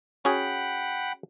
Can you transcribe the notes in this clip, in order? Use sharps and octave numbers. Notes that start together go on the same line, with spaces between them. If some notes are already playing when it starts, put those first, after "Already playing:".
C#4 F#4 G#4 F#5 G5 B5